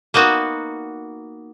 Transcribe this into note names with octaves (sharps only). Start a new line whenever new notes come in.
A#3 B3 D#4 F#4